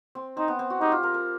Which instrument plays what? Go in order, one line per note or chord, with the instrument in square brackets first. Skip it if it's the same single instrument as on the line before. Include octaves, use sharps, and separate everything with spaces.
[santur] C4
[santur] C4 [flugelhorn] D#4
[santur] B3
C4
F#4
[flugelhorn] D#4 [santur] G4
[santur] F4
A#4
A#4